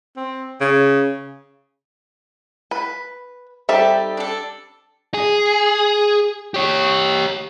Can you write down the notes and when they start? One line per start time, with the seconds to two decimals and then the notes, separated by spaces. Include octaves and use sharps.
0.16 C4
0.60 C#3
2.71 B4
3.69 G3 C4 D#4 G4 A4 E5
4.17 D4 A4
5.14 G#4
6.54 G4 C#5